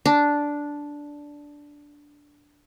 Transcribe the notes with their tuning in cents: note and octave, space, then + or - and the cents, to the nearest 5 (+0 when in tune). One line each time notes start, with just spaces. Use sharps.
D4 -5